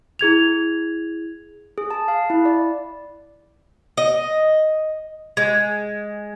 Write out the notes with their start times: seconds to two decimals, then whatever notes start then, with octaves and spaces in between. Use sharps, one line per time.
0.19 E4 G#4 G#6 F7
1.78 G#4
1.91 A5
2.08 F5
2.30 E4
2.45 D5
3.97 D#5
5.37 G#3